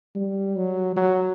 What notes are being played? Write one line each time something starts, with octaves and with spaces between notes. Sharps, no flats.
G3
F#3
F#3